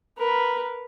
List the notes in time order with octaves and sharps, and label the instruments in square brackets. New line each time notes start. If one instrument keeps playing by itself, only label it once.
[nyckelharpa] A#4 B4